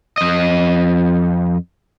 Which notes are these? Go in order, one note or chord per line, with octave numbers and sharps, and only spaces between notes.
F2 D#5